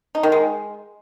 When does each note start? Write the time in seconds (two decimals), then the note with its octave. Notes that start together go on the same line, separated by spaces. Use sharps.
0.15 D#4
0.23 D#3
0.32 G#3